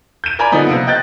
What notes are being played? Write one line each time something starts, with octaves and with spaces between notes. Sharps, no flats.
G6 D#7
A#4 D5 G#5 A#5 B5
D3 F3 B3 D#4
C3 A#3 B3
D#5 G5 F#6 G6 A6